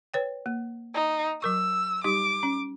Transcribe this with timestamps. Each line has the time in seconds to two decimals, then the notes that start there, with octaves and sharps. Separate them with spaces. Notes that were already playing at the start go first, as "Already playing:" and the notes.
0.14 B4 C#5 G5
0.46 A#3
0.94 D#4
1.42 F#3 A#4 C#6 E6
2.04 G3 D#4 G4 D6
2.43 C#4